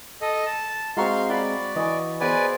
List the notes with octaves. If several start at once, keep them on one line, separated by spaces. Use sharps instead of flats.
A4 D#5
A5
G#3 C4 F#4 F5 A#5 C6 C#6
F#4 D5 F5 B5
E3 D#5 G#5 C#6
B3 G#4 B4 C5 D5 G#5